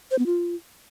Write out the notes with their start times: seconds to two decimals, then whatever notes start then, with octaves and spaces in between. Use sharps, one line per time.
0.11 C5
0.19 B3
0.26 F4